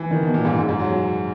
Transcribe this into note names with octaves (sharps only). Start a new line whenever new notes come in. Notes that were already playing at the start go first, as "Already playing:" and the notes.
Already playing: E3
D#3
B2
A#2
G#2
F#2
G#2
F#3
F#3